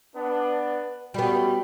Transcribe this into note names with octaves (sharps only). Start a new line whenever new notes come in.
B3 D4 B4
G3 A3 B3 C#4 F#4 B5